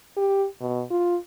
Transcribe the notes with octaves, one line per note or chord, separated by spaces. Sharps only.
G4
B2
F4